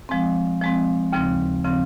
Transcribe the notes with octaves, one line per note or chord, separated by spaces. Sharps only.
F3 G#3 C4
F3 G#3 C4
D#2 C#3 F3 C4
C#3 F3 C4